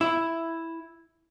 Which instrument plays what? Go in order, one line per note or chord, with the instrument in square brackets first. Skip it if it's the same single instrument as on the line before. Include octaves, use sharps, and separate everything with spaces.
[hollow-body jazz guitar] E4